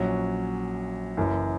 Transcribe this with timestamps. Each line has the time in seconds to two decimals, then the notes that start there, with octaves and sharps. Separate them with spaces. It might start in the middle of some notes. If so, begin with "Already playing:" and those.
Already playing: A#1 A#2 F#3 C#4
1.17 F#1 F#2 E3